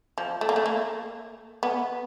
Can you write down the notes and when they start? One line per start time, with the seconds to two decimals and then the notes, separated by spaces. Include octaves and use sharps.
0.18 F3
0.41 A3
0.49 A#3
0.56 A3
0.66 A#3
1.63 B3